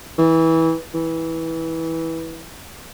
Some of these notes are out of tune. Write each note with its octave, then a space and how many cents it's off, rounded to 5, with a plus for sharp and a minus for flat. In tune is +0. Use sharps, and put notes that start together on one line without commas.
E3 -20
E3 -15